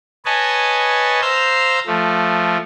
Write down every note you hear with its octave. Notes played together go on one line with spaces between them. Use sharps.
B4 C#5 D#5 G#5 A5
C5 F5 A#5 E6 G6
F3 A3